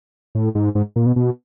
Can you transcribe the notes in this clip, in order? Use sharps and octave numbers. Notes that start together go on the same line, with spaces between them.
A2
G#2
G#2
A#2
B2
B2